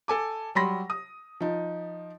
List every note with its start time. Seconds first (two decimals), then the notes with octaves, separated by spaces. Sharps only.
0.08 A4 G#5 D6
0.55 F#3 G3 B5 C6 A#6
0.90 D#6
1.40 F3 D#4